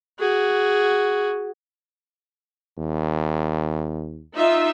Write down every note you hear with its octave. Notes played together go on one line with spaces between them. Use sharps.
F#4 G#4
D#2
D#4 F4 E5